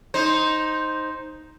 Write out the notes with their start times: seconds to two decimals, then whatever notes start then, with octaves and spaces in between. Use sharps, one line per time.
0.14 D#4 C5